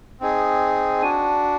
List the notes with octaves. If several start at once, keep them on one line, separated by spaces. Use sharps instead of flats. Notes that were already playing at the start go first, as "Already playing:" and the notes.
C4 D#4 G#4
D4 F#4 G#5